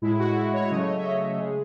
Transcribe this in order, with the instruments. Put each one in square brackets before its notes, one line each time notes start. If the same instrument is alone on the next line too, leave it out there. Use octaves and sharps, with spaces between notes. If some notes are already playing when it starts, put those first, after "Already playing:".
[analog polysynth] A2 G#3 E4
F#4
E4
C#5
C#3 F#3 A3 D#5
C#5
D#5
E5
D#5
C#3 G#3 G#4